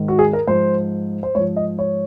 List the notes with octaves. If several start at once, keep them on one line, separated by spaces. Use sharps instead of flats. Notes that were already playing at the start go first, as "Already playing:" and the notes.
Already playing: G#2 D#3
F#4
G#4
A#4
G#2 F3 C5
C5
G#2 F3 C#5
D#5
C#5